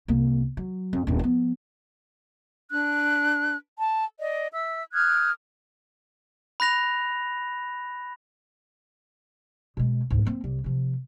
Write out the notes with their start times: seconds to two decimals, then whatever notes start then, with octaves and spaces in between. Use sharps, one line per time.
0.08 C2 A#3
0.57 F#3
0.93 F2
1.07 D#1 G2
1.19 F3 B3
2.70 D4 F#6
3.78 A5
4.19 D5 D#5
4.53 E5 E6
4.94 D#6 F6 F#6 G#6
6.60 B5 F#6 A#6 F7
9.77 B2 G#3
10.10 D2 G#2
10.25 A#3 C4
10.44 C2
10.64 C3 F3